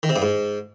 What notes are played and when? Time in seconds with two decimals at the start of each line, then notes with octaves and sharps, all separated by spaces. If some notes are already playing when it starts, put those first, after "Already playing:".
0.03 D#3
0.09 C3
0.16 G2
0.22 G#2